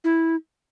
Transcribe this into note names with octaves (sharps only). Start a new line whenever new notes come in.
E4